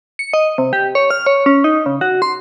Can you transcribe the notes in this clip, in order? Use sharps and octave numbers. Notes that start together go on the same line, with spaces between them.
C#7
D#5
C3
G4
C#5
F6
C#5
C#4
D#4
C#3
F#4
C6